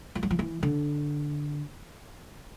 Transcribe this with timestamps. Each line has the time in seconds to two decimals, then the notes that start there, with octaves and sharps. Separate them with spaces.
0.15 F3
0.23 F#3
0.30 F3
0.39 E3
0.63 D3